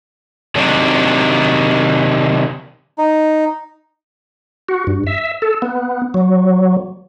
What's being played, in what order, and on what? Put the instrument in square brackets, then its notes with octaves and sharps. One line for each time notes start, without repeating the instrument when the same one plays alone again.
[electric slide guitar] C3 D#3 F#3 D4
[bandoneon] D#4
[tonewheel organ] F#4
G2
E5
A4
B3
F#3